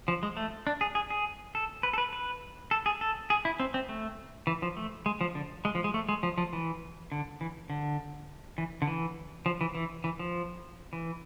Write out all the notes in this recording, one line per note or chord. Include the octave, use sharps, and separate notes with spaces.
F3
G#3
A3
D4
G#4
G#4
G#4
A4
B4
A4
B4
B4
A4
G#4
A4
G#4
E4
C4
C4
A3
E3
F3
A3
G#3
F3
D3
G#3
F3
G#3
A3
G#3
F3
F3
E3
D3
E3
D3
E3
D3
E3
F3
E3
E3
E3
F3
E3